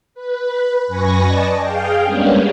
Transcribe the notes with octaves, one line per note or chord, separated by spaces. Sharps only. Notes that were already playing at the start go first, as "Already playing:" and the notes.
B4
F#2 B4 G#5 C#6 A#6
D5 D#5 A5
G#4 F5 G5
G3 G#3 A#3 B3 C#4 D4